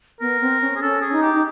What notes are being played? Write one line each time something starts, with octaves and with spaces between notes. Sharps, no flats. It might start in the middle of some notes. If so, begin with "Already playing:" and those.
B3 A#4
C4
C#4
G#4
C#4 A4
G#4
D#4
G4
D#4